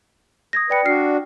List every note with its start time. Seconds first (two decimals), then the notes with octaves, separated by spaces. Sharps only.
0.53 D#6 G#6 A#6
0.70 B4 D5 G5 C#7
0.85 D4 F#4 F6 C7